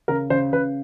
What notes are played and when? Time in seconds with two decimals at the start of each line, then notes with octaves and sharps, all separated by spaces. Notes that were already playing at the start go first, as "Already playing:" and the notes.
0.08 C#3 A#4
0.30 C#3 C5
0.52 C#3 B4